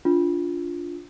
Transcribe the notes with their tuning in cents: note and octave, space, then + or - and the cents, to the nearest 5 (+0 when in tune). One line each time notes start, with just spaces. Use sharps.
D4 -20 F4 +0